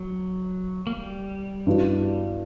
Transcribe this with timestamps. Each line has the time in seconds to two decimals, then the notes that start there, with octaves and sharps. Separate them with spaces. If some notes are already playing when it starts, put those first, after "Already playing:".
Already playing: F#3
0.87 A#3
0.95 G3
1.67 G2 E3 B3 F#4